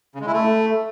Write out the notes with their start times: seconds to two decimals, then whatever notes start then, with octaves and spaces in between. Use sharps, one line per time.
0.15 C#3
0.21 G#3
0.27 E4
0.33 A3